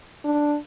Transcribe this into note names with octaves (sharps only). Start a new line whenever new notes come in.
D4